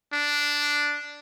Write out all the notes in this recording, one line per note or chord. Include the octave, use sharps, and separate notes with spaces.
D4